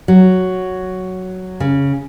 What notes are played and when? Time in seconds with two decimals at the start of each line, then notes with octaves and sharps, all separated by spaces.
0.08 F#3
1.60 C#3